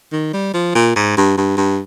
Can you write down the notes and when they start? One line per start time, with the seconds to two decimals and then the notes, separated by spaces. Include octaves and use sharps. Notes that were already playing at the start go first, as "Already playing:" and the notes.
0.13 D#3
0.33 G3
0.54 F3
0.75 A#2
0.96 G#2
1.17 G2
1.37 G2
1.57 G2